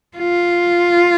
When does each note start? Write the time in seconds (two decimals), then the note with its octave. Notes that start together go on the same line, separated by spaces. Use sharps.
0.17 F4